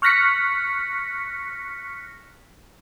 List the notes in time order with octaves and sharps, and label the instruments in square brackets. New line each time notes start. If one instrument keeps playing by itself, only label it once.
[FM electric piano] C#6 F6 F#6 A#6 B6 C#7